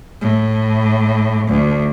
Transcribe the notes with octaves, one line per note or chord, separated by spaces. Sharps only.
A2
D2